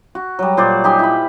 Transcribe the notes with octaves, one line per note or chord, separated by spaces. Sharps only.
F#4
F#3 G3
A#2 C5 D5
D#4 G4 G#5 C6
E4 B5